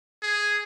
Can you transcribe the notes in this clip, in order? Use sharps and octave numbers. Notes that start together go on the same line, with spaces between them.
G#4